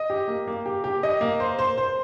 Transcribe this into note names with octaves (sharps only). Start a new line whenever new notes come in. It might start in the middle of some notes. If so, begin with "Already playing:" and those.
Already playing: D#5
G4
A#3
A#3
G4
G4
D#5
A#3
C5
C5
C5